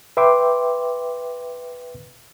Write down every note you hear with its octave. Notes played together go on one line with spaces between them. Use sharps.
B4 E5 G5 C6 D6